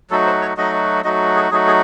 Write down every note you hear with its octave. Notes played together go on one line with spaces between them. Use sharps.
F#3 A3 D#4 F#4 A4
C5
C#5
F#3 A3 D#4 F#4 D#5
F#3 A3 D#4 F#4 D#5
G#4
F#3 A3 D#4 F#4 G#4
G#4